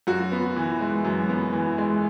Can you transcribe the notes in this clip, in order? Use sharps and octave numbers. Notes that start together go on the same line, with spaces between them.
F#2 F#4
B3
E3
G#3
F#2
B3
E3
G#3